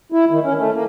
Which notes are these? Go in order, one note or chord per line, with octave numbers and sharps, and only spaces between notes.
E4
D#3
C#4
A3
A#3